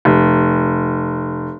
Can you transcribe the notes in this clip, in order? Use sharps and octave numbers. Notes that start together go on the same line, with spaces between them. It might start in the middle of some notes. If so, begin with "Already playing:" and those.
F1